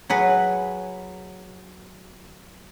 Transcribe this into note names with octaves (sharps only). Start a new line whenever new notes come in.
F#3 G#4 B4